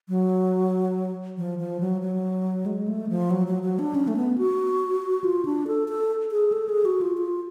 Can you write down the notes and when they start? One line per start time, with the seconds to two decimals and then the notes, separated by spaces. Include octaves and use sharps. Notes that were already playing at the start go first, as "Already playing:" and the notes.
0.08 F#3
1.38 F3
1.59 F3
1.80 F#3
2.02 F#3
2.66 G#3
2.88 A3
3.09 F3
3.31 F#3
3.47 F#3
3.63 F#3
3.79 D4
3.95 C#4
4.08 A3
4.17 B3
4.38 F#4
5.24 F4
5.45 D4
5.67 A4
5.88 A4
6.31 G#4
6.52 A4
6.69 G#4
6.85 F#4
7.01 F4
7.17 F4